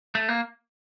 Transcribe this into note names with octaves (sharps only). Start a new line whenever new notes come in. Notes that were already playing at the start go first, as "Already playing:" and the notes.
A3
A#3